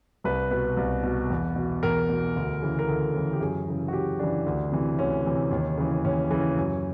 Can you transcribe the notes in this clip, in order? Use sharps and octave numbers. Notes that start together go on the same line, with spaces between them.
C2 B4
B2 B4
C2
B2
E2
B2
E2 A#4
B2
D2
C#3 E3
A#4
D2 A4
C#3 E3
G4
F#2 G#4
C#3 E3
F#4
F#2 G4
C#3 E3 D4
D2
C3 E3
D2 C#4
C3 E3
D#2
C#3 E3
D#2 C#4
C#3 E3
F#2